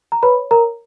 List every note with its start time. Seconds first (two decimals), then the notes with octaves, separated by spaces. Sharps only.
0.12 A#5
0.23 B4 C#5 B5
0.51 A#4 A#5